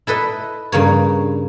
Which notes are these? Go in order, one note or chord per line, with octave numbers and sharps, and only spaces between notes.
E4 A4 B4 D#5
G2 C#3 A#3 C#5